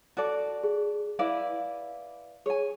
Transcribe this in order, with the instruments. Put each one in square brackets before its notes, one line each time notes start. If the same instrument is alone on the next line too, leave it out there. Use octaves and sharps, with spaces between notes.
[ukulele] F#4 A4 D5
[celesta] G#4
[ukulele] E4 B4 D5 [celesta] F5
[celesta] G#4 [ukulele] C#5 G#5